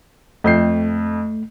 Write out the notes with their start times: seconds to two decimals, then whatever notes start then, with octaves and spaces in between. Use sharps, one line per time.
0.44 F2 A3 G6 C7